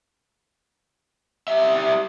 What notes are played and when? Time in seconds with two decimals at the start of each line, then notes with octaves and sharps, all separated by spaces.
1.48 G3 E5